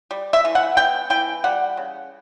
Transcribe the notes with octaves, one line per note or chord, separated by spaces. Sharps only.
G3
E5
E3
F#5
B3 G5
E3 G5
G3 F#5
C#3